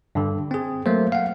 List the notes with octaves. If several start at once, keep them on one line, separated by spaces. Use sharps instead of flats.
G2 D3
C4 G#4
F#3 A3 A#3 C5
F5 F#5